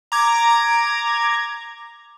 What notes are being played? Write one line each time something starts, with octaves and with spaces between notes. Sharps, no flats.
A#5 D6 G#6